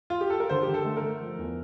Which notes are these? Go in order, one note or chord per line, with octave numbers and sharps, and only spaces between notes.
F4
G4
A4
A#4
D3 C5
G4
D3
A4
A3
A#4
A3
F3
E2